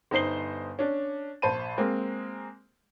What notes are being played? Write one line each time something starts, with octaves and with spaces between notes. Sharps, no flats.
G1 D#4 C5 C7 G7
C#4 D4
A#1 C5 A5 B5 D#7
G#3 A#3 C4